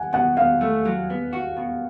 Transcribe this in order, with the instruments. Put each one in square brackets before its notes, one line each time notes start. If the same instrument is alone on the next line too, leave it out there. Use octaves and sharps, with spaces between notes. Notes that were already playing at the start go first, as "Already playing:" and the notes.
Already playing: [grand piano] F#5 G#5
[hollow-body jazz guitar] B2 [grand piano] F#5
[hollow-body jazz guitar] B2 [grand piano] F5
[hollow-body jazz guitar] A3
F#3
B3
F#4
B2